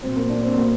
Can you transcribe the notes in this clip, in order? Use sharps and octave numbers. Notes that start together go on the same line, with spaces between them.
A#2 F#3 C4
A#3
D4
C4
A#2 F#3 A#3